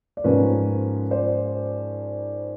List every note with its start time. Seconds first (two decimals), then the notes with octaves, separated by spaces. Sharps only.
0.17 D5
0.24 G#2 F3 A#3 C#4 B4 C#5
1.11 C5 D5